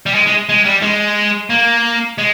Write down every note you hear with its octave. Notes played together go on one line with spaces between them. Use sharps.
G3
G#3
G#3
G#3
G3
G#3
A#3
G#3